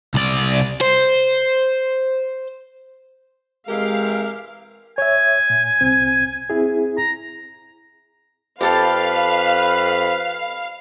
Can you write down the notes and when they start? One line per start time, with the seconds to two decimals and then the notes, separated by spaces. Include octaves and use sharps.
0.14 C2 D5
0.81 C5
3.68 C3 E3 G#3 G4 A#4 F5
4.98 C#5 E5 G#5
5.50 A#2
5.81 C2 C4
6.50 C4 E4 G#4
6.97 A#5
8.61 F2 G4 A4 B4 F5 A5